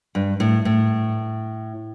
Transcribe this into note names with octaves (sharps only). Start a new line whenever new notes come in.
G2
A2
A2